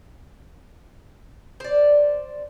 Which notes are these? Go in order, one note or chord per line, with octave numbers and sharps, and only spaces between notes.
C5 D5